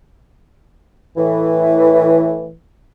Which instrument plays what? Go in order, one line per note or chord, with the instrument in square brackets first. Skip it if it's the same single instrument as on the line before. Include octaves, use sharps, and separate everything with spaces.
[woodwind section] A2 E3